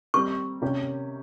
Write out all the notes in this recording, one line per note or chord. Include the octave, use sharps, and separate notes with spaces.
D#3 G3 C4 C#6
C3 D#3 A#3 C#4 G4